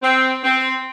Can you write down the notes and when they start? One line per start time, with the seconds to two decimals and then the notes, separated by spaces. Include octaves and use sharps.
0.03 C4
0.44 C4